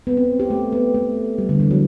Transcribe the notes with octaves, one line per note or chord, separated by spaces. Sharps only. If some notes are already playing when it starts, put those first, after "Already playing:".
B3
C4
G4
A3
B3
A3
G3
D3
E3
F#3